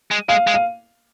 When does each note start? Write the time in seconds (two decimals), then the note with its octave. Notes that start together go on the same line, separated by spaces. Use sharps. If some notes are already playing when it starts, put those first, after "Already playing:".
0.11 G#3
0.28 G#3 F5
0.47 G#3
0.54 F5